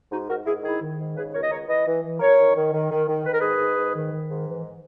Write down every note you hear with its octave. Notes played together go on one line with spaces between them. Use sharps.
G#2 D#4 F#4
G#2 F#4 A#4
G#2 E4 G#4
D#3 E4 G#4
D#3
G#2
C#3 G#4 B4
C#2 A#4 C#5
D#5
C#2 A#4 C#5
E3 B4 D#5
E3
E3
F#2 A#4 C#5
D#3
D#3
D#3
D#3
D#3
D#3 B4
A#4
G#2 G#4 B4
G#2
G#2
D#3
D#3
G#2
E3
E3